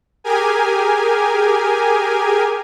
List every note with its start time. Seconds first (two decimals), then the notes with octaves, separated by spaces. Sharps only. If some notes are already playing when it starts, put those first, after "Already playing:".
0.24 G4 G#4 A#4 G#5